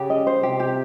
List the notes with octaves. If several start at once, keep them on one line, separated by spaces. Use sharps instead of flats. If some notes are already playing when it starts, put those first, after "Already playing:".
Already playing: C#3 G4
D#5
C5
C3 G4
G4